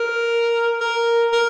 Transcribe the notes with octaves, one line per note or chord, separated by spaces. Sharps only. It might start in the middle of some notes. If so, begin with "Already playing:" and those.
Already playing: A#4
A#4
A#4